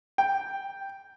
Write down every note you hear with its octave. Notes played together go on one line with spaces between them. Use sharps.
G5